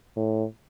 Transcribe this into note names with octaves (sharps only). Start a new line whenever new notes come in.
A2